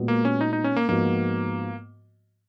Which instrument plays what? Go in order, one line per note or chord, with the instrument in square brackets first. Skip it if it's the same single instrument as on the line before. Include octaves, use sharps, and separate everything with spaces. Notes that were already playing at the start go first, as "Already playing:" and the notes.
Already playing: [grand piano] A#2 G#3 B3 F#4
[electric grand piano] A#3
C#4
D#4
D#4
C#4
A#3
[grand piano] G#2 F3 B3 F#4 [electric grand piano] A#3